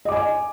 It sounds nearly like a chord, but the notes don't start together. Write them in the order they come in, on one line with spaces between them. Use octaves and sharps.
D#5 D6 G#5